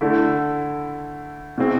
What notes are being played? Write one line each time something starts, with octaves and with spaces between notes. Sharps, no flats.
D3 A3 E4
B2 G#3 C4 E4